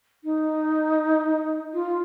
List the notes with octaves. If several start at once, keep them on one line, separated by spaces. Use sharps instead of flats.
D#4
F4